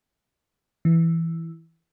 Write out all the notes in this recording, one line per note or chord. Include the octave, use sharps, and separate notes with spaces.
E3